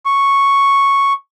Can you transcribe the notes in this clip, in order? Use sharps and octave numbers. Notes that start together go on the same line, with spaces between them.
C#6